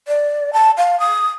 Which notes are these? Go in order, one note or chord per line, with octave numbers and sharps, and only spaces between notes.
D5
A5
F5
D#6